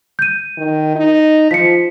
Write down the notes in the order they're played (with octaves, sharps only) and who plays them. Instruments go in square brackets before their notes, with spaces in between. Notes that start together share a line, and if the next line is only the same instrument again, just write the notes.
[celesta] G6 D#7
[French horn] D#3
D#4
[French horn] F3 [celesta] B6 C#7